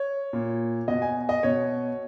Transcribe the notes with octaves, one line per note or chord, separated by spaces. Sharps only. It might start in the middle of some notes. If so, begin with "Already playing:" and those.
Already playing: C#5
A#2
B2 D#5
G#5
D#5
B2 C#5